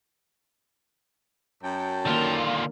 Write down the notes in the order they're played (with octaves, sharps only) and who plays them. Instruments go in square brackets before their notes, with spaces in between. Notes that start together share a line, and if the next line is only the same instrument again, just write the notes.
[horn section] F#2 G5 A5
[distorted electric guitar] D3 F4 [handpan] D#3 A#3